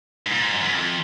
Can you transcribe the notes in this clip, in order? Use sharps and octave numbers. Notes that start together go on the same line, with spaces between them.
G#2
A#2
G#2
F#2
F#2
F2